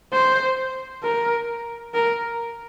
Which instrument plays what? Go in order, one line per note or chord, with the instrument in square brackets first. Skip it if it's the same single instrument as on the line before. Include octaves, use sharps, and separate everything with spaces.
[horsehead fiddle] C5
A#4
A#4